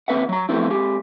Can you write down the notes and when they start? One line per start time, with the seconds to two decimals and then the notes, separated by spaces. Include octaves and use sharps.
0.08 D#2 G#3 C4 B4 E5 F#5
0.29 F#3 A#5
0.49 F3 F#3 A3 B3 C4 E4
0.70 G#3 C4 G4